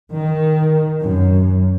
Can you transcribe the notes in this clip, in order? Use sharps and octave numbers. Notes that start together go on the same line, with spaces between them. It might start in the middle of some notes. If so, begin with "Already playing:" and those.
D#3
F#2